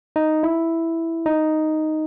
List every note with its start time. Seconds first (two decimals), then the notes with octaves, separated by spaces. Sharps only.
0.16 D#4
0.43 E4
1.26 D#4